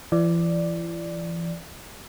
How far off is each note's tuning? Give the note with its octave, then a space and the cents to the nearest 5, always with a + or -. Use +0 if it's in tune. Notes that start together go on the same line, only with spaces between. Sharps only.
E3 +40 D5 +0